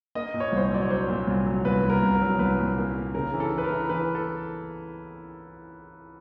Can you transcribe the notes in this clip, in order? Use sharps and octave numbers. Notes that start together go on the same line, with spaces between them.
A#3 D#5
A#2
C#5
C2 C5
C#5
F#3 D5
C#5
F#3 C5
A#2
C2
F#3
C2 B4
C2
A#4
C2
A#4
F#3
C2 B4
A#2
A#3
A#3
C#3 A#4
E3
A4
E3
B4
A#4
E3
E3 B4
A4